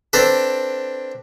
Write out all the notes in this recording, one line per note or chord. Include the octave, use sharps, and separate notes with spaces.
C4 D4 A4 B4